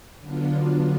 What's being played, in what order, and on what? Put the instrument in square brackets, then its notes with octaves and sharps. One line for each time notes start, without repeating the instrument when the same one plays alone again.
[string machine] D3 F#3 B3 D4 F4